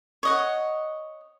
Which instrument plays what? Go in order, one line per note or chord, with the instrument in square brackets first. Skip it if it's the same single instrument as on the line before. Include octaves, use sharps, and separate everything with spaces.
[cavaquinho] C#5 D#5 F#5